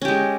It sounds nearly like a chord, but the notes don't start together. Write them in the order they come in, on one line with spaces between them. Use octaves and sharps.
C#4 G4 G#3